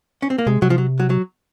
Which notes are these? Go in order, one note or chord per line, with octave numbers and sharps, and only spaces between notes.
C#4
C4
A#3
C3 G#3
C3 F#3
F3
F#3
F#3
F#3